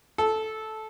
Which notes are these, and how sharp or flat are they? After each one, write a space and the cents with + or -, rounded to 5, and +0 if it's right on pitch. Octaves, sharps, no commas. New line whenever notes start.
A4 -10